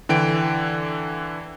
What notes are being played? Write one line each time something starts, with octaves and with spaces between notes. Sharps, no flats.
D3 E3 G5 D7